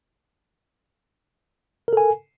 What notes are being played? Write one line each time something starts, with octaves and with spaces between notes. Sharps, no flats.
A4 A#4 G#5